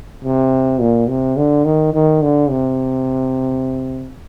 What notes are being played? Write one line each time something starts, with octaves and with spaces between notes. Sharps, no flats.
C3
A#2
C3
D3
D#3
D#3
D3
C3